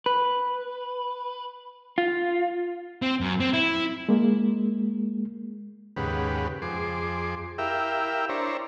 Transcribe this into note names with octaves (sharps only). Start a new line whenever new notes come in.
B4
F4
C4
F#2
C4
E4
G#3 A#3
D#2 G#2 C#3 G4 B4 F#5
F2 G#4 C6 D6
E4 G4 A#4 E5 F5 G5
D4 E4 C5 C#5 A#5